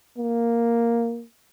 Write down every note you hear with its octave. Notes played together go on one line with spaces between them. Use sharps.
A#3